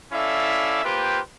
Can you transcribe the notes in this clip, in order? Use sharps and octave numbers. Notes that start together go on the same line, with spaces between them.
C#4 E4 A4 D5 E5 F5
A#3 F4 G4 B4 C5 G5